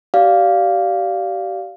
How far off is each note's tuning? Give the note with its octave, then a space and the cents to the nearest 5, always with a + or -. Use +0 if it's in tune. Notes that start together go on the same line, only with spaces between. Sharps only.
G4 -35 D5 -20 F5 +0